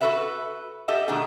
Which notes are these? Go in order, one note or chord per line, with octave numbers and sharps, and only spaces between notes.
F#4 G#4 A4 B4 E5 F#5
G4 A4 D#5 E5 F#5 A5
B2 D#3 A3 D4 G#4 F#5